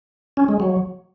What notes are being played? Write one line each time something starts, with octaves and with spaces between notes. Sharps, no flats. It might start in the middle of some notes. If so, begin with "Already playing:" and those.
C#4
G#3
F#3